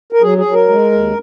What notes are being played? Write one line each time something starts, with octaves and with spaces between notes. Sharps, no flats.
A#4
F#3 G#4
G#4
F#3
A#4
G#3
D#2